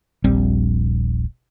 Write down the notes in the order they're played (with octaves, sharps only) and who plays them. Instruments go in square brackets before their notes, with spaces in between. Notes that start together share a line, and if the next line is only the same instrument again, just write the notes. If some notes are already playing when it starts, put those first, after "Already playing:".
[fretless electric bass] D#1 A#1 G3 C4